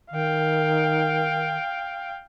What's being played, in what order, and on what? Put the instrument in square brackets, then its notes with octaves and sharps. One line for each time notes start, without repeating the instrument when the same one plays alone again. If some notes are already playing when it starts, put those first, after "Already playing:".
[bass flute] D#3 [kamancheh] F5 G5